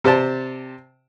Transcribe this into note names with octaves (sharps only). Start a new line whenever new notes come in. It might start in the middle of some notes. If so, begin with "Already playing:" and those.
C3 G4 C5 D5 A5